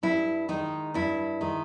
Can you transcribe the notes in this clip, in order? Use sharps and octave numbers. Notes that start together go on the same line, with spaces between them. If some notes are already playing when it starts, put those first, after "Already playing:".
G2 E4
D#3 G#3 D#4
G2 E4
D#3 G#3